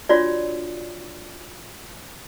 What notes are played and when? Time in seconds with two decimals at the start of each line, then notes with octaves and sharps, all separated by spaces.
0.09 D4 F4 F#4 C#5 D5